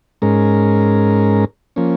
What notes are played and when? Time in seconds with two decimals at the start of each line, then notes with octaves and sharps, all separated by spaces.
0.22 G#2 G#3 C#4 A#4
1.76 F3 A#3 C#4